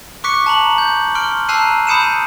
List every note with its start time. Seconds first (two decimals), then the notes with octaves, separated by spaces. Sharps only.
0.24 C#6 D6 F#6 B6 C#7
0.46 A5 A#5 F#7
0.78 G6
1.15 C6 F6 D7
1.49 A5 A#5 E6 F#6 C7 D#7
1.87 B5 D#6 G6 C#7 D#7 E7